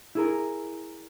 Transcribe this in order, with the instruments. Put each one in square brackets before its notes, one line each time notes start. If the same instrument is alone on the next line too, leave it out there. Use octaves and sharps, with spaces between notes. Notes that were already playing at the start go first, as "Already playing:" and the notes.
[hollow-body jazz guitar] E4 G#4 A#4